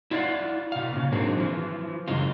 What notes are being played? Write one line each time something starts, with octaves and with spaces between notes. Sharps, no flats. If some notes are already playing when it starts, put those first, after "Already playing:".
E4 F4 D5 F5 F#5
B2 F5
A#2 C#3
G#2 D3 F#3 A#3 C4 G#4
E3 F3
F#2 C#3 G#3 F4